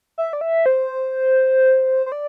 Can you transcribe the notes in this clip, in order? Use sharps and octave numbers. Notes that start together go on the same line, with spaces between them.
E5
D5
E5
C5
C5
D5